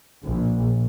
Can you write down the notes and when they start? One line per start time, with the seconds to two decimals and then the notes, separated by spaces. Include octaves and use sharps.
0.25 A#1